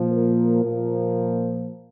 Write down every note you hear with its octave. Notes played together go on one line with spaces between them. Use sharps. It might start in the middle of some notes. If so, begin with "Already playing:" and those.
Already playing: A#2 F3
A#4
A#2 F3